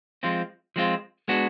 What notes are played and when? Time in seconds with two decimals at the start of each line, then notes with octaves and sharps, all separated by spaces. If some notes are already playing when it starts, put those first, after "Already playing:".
0.23 F3 G#3 C4 F4
0.76 F3 G#3 C4 F4
1.28 G#3 B3 D4 F#4